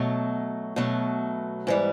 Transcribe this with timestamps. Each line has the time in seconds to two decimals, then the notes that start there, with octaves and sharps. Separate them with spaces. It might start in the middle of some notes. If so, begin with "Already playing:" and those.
Already playing: B2 F#3 A3
0.76 B2 F#3 A3
1.67 G#2 E3 G3